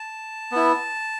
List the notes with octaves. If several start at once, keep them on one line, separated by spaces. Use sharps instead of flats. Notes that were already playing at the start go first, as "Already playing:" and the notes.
Already playing: A5
B3 E4